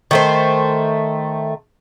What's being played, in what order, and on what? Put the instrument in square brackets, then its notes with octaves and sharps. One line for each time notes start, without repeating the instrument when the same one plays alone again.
[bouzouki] D#3 A3 C5